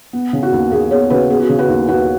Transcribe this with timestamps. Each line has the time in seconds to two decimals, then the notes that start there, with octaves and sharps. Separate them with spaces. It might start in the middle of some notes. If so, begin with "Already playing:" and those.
0.13 B3
0.33 C#3
0.43 F#4
0.52 D#2
0.71 D#2 G#4
0.91 B3 G#4 C#5
1.10 C#3 F#4 B4
1.30 B3 G#4
1.39 F#4
1.47 G#4
1.49 C#3
1.59 F#4 B4
1.69 D#2
1.88 D#2 F#4 B4